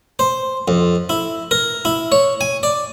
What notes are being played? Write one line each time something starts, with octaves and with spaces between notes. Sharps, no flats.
C5
F2
E4
A#4
E4
C#5
G#5
D5